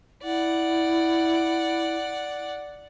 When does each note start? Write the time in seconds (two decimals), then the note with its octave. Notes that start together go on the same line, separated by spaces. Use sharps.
0.23 E4 D5 F#5